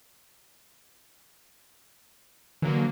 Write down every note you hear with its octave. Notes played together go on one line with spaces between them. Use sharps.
D3 E3 F#3 A#3